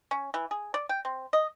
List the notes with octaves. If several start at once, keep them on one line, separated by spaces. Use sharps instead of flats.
C#4
E3
G#4
D5
G5
C4
D#5